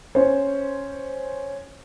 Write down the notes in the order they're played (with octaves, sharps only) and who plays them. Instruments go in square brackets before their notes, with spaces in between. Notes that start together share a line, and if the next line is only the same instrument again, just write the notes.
[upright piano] C#4 C5